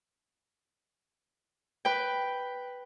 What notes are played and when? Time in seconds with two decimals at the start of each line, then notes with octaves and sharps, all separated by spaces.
1.85 B4 G5